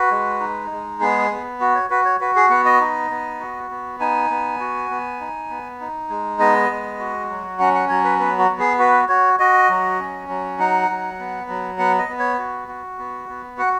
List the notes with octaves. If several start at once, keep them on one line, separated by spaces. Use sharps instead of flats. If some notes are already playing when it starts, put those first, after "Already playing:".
Already playing: F#4 B4
G#3
D#4
G#3
B3 G#4
B3
F#4
C#5
F#4 B4
C#5
F#4 B4
G#4
B3 F#5
D#5
D#4
B3
F#4
B3
D#4 G#5
B3
F#4
B3
D#4
B3
D#4
G#3
B3 D#5
G#3
F#4
F#3
C#4 F#5
F#5
F#3 C#5
B4
B3 B4
F#4
B3
G#4
F#4 B4
F#4 C#5
F#4 D#5
F#3
C#4
F#3
D#4 F#5
F#3
B3
F#3
B3 F#5
D#5
B3
C#5
F#4
F#4
B3
B3
F#4 F#5